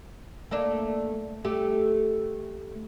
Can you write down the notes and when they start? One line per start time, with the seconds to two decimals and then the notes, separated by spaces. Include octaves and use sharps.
0.51 A3 A#3 D4
1.45 A3 G4